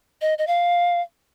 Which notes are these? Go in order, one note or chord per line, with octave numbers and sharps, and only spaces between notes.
D#5
D#5
F5